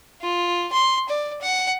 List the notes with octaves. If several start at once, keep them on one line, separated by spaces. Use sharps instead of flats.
F4
C6
D5
F#5